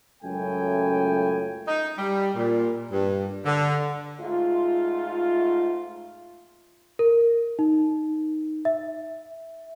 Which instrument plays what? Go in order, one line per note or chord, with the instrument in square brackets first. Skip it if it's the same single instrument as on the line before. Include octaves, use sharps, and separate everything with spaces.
[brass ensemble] C#2 F#2 A2 A3 G5 G#5
[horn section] D#4
G3
A#2
G2
D3
[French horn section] G#2 A3 F4
[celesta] A#4
D#4
E5